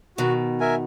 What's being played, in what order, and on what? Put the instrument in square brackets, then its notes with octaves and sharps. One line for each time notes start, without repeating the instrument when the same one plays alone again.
[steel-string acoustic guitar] B2 D#3 [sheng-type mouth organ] F#4
[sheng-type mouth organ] A#4 E5 G#5